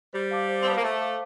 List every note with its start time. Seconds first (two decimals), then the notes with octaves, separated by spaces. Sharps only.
0.13 G3 C5
0.31 F5 A5 D6
0.49 C5
0.62 C4
0.66 B3 F5 A5 D6
0.77 A#3
0.83 A3 C5
1.01 F5 A5 D6